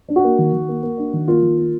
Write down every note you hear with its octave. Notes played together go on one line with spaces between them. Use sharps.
D4
F#4
A#3
D#3
D#3
A#3
A#3
D4
D#3
A#3 F4
D#3
A#3